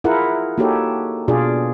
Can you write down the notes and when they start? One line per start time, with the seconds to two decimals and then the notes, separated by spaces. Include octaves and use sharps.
0.04 E4 F4 G#4 A#4 F#5
0.58 A#3 D#4 F#4 G4 A4 C#5
1.28 B2 D4 F4 G#4 D5